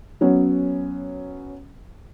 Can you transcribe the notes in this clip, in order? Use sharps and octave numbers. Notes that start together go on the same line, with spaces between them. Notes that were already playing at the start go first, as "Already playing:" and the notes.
F#3 B3 C#4